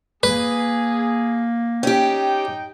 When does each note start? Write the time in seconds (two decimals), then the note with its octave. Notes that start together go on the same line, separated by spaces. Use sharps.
0.23 A#3 G#4 B4
1.83 C#4 D#4 G4 G5